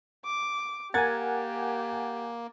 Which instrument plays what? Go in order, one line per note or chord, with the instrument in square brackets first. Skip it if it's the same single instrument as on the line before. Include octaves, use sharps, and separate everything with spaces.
[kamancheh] D6
[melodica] A#3 [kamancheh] G4 [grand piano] A#4 G#6 A6 [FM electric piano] F#5 G#5